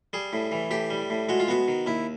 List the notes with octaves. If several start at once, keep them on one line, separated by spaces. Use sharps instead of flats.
G3 G#4
A2
E3
A2 G4
G3
A2
G#3 F#4
F4
B3 F#4
D#3
D#2 E4